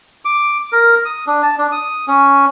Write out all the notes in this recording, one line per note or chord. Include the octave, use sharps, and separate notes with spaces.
D6
A#4
D#6
D4
A5
D4
D#6
C#4